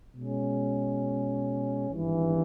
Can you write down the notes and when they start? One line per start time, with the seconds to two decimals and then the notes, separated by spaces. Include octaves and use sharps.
0.15 B2 G#3 C#4
1.90 G#1 G2 E3